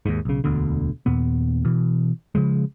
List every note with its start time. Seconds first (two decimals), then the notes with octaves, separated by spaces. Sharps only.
0.06 D#2 G#2
0.25 B1 C#3
0.44 E1 D2 B2 D3
1.06 D#2 A#2 B3
1.65 B2 E3
2.35 C#3 F3 G#3